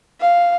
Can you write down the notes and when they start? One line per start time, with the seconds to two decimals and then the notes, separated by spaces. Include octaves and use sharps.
0.21 F5